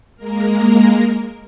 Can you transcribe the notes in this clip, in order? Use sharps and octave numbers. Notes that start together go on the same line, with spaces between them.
G#3 A#3 A#4